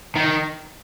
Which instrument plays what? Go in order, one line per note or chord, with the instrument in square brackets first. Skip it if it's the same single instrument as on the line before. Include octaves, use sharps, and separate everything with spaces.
[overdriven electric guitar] D#3